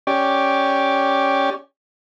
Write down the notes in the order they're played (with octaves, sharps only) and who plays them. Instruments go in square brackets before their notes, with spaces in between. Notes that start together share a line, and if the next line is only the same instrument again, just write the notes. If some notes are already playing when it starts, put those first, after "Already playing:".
[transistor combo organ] C#4 G4 D5